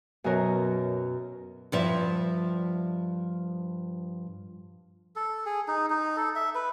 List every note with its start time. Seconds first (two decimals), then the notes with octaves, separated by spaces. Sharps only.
0.24 F#2 B2 F#4 A#4 C#5
1.72 G2 F3 E5
5.16 A4
5.46 G#4
5.68 D#4
5.90 D#4
6.17 A4
6.36 E5
6.55 B4